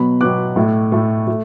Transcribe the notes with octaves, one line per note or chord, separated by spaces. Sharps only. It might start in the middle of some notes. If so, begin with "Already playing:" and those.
Already playing: B2 F#3 B3 B5
B2 F#3 B3 D6 F#6
A2 A3
A2 A3
A3